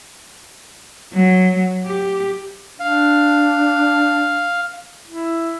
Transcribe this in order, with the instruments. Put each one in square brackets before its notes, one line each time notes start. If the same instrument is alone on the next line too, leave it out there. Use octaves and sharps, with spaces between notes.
[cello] F#3
G4
[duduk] D4 [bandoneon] F5
[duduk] E4